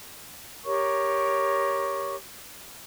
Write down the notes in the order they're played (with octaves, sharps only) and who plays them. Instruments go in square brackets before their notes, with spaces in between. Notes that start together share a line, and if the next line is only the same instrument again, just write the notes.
[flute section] G4 A#4 C#5 C#6